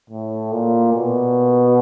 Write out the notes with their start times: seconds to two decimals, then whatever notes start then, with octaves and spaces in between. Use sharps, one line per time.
0.10 A2
0.52 A#2
0.94 B2